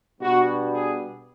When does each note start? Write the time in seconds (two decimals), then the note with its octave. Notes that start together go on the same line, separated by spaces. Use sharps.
0.21 B2 G3 B3 D4 F#4
0.73 G#4